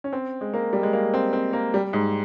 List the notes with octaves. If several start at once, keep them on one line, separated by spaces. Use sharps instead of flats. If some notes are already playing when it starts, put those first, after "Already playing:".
C#4
C4
G#3
A#3
G3
G#3
A#3
C4
C4
A#3
G3
G#2